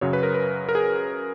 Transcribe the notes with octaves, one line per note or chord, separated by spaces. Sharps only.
F#2 C#3 F#3 C#5
B4
A#4
B4
A#4
G#4